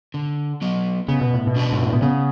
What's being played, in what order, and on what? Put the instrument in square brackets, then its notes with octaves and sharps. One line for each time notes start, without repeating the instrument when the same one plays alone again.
[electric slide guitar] D3
F#3 B3
[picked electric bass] C#3 [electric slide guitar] B3
[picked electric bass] B2
A2
B2
[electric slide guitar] D4 F#4 B4 D5
[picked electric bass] G#2
A2
B2
[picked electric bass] C#3 [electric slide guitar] B3